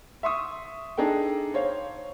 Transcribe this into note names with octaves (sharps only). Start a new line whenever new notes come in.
E5 C6 C#6 D#6
D4 D#4 G#4 A4 G5
C5 C#5 F5